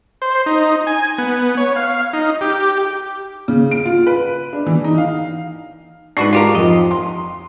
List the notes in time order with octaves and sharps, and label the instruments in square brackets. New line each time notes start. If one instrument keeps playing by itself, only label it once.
[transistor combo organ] C5
D#4
G#5
B3
C#5
F5
D#4
G4
[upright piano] C#3
D7
F4
B4
D4
E3
D#4
F5
[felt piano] G#2 C#6 C7 [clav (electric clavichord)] D4 F#4 B4
[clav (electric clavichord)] F4 G4 A#4
[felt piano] F2 [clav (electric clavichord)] D#5
[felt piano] C6